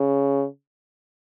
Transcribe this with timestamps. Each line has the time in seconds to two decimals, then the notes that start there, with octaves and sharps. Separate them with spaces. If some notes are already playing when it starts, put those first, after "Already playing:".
Already playing: C#3